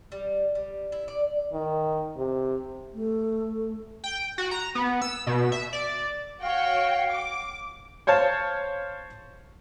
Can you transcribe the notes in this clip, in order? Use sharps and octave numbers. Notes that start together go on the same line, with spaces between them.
G3
G3
E4
D5
D#3
C3
A3
G5
F#4
A#5
B3
E6
B2
E5
D5
F#4 C#5 F5 G5
D6
C5 C#5 F5 A5